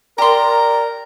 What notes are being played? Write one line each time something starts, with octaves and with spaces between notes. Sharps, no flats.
G4 A#4 D5 A#5 C6